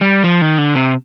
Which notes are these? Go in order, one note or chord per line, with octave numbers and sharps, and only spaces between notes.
G3
F3
D#3
D3
C3